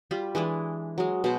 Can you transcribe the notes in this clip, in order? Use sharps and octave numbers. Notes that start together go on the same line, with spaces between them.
G3 F4 B5
E3 G#3 D4 E4
F#3 G#3
B2 C5